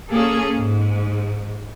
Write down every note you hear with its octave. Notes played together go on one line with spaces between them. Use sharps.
A#3 C#4 G#4 A4
G#2